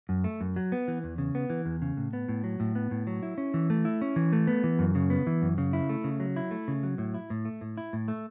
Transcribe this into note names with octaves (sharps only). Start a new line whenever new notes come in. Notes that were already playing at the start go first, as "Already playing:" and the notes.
F#2
A3
F#2
F#3
B3
E3
E2
C#3
B3
E3
E2
C#3
A2
B3
A2
F#3
A2
B3
A2
F#3
E4
C#4
E3
A3
E4
C#4
E3
A3
B3
E3
F#2
C#3
B3
E3
F#2
C#3
E4
A3
C#3
F#3
E4
A3
C#3
F#3
A2
E4
A2
A3
A2
E4
A2
A3